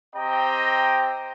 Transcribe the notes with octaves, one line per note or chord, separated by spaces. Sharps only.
C4 G4 D#5 G5 A#5